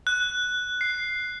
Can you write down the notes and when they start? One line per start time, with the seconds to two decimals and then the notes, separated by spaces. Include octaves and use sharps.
0.07 F#6
0.81 C7